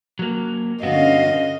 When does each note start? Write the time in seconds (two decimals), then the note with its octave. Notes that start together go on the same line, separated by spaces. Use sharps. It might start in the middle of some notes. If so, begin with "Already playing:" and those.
0.19 F#3 A#3
0.83 G2 D3 B3 C#4 F#4 D#5 F5